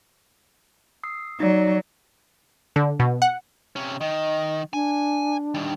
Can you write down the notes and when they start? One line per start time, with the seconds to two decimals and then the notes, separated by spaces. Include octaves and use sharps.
1.03 D#6 E6 C7
1.40 F#3 D#4 D5
2.76 D3
3.00 B2
3.22 F#5
3.76 C3 C#4
4.01 D#3 D#5
4.73 D4 G#5
5.54 D#3 G3